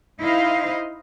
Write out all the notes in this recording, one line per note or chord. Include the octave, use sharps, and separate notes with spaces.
D#4 E4 C5 D#5 F5